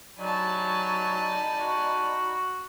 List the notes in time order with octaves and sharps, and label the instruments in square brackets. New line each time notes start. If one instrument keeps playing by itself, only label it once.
[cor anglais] F#3 [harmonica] D#4 D5 B5 [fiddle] G#5 A5
[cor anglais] F#4